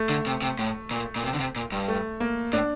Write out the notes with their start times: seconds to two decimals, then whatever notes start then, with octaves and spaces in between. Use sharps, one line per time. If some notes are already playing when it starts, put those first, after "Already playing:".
Already playing: A3
0.09 D3
0.26 C3
0.42 C3
0.59 A2
0.91 A#2
1.16 A#2
1.24 C3
1.34 D3
1.39 C3
1.56 A#2
1.72 G2
1.88 A3
2.20 A#3
2.53 A2 D4